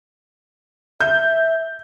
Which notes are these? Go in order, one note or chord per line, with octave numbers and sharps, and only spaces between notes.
E5 G6